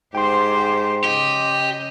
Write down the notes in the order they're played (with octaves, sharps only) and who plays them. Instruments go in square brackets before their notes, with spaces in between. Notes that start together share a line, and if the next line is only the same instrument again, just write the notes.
[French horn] G#2 [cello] G4 C5 [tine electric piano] G5 C6
[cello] C#3 D#5 [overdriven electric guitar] G4